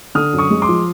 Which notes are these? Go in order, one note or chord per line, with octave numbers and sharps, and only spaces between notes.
D3 D#6 F6
F#2
C#6 D#6
G#3
C6 D6
F3